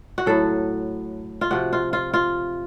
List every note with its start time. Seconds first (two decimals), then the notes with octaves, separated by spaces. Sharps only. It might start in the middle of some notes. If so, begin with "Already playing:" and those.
0.18 F#4
0.26 A2 F#3 A4
1.41 F4
1.51 C3 F3 F#4
1.73 F4
1.93 F4
2.14 F4